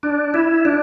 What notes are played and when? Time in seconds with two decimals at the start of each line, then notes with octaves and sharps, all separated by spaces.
0.03 D4
0.34 E4
0.65 D4